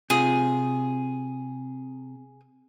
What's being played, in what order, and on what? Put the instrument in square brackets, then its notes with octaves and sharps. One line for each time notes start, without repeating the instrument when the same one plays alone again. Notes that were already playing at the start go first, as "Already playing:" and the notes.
[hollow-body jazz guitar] C3 F4 [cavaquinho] G#4